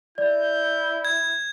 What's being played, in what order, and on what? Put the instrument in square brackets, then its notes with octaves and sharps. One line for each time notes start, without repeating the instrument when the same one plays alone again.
[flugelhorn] E4 [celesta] D5 [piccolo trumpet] G6
[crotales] G#6